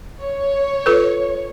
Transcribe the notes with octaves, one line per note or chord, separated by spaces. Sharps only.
C#5
F4 A4 B4